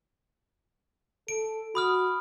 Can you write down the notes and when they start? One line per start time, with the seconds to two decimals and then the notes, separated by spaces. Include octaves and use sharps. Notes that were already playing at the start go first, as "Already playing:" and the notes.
1.28 A4 D7
1.75 F#4 B5 D#6 F6